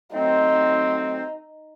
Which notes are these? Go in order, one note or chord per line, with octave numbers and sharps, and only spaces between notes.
F#3 A3 C4 D#4